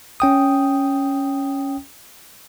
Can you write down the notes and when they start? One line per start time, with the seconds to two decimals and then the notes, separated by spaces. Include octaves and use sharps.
0.20 C#4 G5 D#6